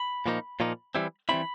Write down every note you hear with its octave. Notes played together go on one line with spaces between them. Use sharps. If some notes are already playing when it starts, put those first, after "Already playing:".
Already playing: B5
A#2 F3 A#3 D#4
A#2 F3 A#3 D#4
E3 G3 C4 E4
E3 G3 C4 E4 B5